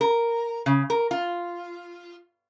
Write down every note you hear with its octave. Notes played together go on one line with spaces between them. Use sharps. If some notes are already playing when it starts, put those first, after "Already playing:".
A#4
C#3
A#4
F4